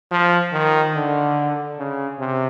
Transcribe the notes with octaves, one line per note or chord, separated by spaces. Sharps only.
F3
D#3
D3
C#3
C3